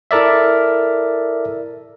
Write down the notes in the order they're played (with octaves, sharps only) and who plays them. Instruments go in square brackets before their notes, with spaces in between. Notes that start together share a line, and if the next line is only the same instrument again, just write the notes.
[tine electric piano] E4 A4 A#4 D5 E5